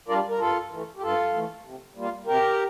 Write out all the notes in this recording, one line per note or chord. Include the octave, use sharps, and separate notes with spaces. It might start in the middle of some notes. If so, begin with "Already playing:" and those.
G3 D4 F4 A#4 D5
A#4
G2 F4 A4
E3 A3
G4
G2 F4 A4
E3 A3
C3
G3 A#3 F4
C3 G4 A#4